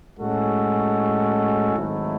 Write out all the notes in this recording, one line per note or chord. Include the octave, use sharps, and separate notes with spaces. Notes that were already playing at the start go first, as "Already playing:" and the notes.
A2 G#3 C#4 F#4 A4
G#1 G#2 F#3 A3 E4